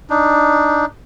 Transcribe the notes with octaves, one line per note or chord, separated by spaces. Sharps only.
D4 D#4